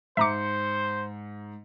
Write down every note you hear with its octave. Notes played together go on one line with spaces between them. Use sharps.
G#2 C5 E5 A#5 D6 C#7